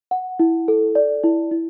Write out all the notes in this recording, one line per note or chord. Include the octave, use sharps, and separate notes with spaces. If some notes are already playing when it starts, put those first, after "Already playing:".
F#5
E4
A4
D5
E4
E4